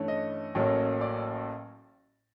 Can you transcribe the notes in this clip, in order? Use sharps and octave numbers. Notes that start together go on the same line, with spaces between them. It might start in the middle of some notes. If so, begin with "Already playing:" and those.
Already playing: G2 E3 A3 C#4
D#5
A1 A2 F#3 A#3 C#4
D5